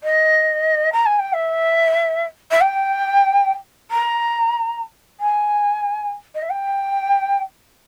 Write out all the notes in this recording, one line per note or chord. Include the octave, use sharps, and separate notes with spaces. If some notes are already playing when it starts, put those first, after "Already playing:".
D#5
A#5
G#5
G5
E5
E5
G5
A#5
G#5
D#5
E5
G5